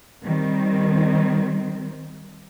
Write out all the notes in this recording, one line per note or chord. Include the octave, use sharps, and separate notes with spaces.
D#3 G3 C4